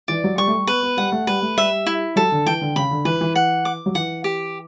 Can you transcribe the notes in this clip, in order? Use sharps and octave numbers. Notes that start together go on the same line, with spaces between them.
E3 D5
F#3
G3 C#6
A3
G3
B3 B4
B3
G3 F#5
A3
G3 B4
A3
G3 E5
E4
F#3 A4
D3
E3 G5
D3
C#3 B5
D3
E3 B4
E3
F#5
D6
F#3
E3 F#5
G4